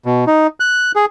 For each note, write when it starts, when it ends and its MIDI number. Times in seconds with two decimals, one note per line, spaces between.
0.05 0.25 47
0.27 0.47 63
0.60 0.92 90
0.96 1.05 68